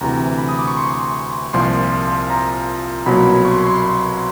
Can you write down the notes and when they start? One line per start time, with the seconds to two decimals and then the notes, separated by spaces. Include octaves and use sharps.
0.01 D2 C3 E3 A#5
0.38 B5
0.49 D#6
0.59 D6
0.67 C#6
0.77 C6
1.53 C2 A#2 F3 C6
2.30 A#5
3.06 C2 B2 F#3 A#3 B5
3.45 C#6
3.51 C6
3.60 B5
3.67 C6
3.82 B5